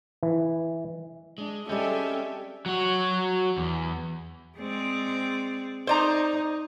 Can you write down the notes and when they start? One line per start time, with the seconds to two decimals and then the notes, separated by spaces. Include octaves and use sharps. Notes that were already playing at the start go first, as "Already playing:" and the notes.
0.23 E3
1.38 G#3 D4
1.69 G3 G#3 C4 C#4 A4 E5 G5
2.66 F#3 F#4
3.58 E2
4.58 G#3 C4 D5
5.87 D#4 C5 D5 A#5